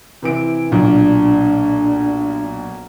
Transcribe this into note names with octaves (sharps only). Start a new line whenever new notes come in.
C3 E3 D7
B1 A#2 D4